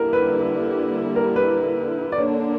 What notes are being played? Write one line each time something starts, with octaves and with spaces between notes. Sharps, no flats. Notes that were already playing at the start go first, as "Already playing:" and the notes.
Already playing: D3 G3 A#3 E4 A#4
B4
A#4
B4
D5
D3 A#3 D4 C#5